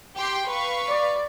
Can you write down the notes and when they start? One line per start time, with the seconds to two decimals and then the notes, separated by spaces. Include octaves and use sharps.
0.16 G4 G5 C6
0.48 B4 F5 C#6
0.87 D5